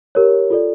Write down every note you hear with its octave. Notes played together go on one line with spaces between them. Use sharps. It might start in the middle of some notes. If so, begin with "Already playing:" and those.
G4 A#4 C#5
F4 A4 D5